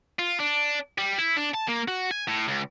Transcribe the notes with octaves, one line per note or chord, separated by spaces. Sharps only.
F4
D4
G3
E4
D4
A5
A#3
F#4
G#5
A2
C#2